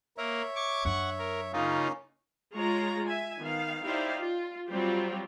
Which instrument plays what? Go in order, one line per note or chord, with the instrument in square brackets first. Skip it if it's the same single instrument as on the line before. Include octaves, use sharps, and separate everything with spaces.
[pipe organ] A#3 A#4 [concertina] C#5 E5
[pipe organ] C#6 D6 G#6
[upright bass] F#2 D4 [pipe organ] F#5 C#6
[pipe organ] A#4
[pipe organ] C#3 D#4 F4 [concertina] A#3 C#4
[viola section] G#3 F4 C#5 A#5
E5 G#5
D#3 B3 F5
D#4 E4 G4 C5 D5 F5
F4
F#3 G3 C4 F4 G4